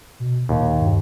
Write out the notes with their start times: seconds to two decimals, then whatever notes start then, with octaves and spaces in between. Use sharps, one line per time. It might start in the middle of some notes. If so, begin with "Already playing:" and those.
0.20 B2
0.49 D#2 A#2
0.80 G2